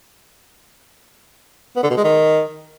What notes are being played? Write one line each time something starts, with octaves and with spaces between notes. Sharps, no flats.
B3
D3
B2
G#3
D#3